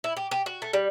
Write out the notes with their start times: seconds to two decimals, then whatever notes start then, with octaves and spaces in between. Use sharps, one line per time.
0.04 E4
0.17 G4
0.31 G4
0.46 F#4
0.62 A3
0.73 G3